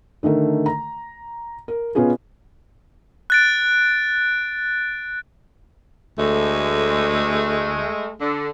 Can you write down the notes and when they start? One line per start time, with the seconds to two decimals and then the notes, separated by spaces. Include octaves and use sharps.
0.23 D3 D#3 A3 A#4
0.66 A#5
1.68 A#4
1.95 B2 B3 C#4 F4 G#4
3.30 F#6 A6 D7
6.19 D2 G#3 A3
8.20 D3